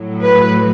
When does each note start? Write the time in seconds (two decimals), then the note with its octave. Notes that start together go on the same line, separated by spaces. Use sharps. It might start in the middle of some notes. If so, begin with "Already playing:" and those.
Already playing: A2 F#3
0.22 B4